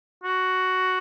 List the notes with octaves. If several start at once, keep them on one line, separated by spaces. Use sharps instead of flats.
F#4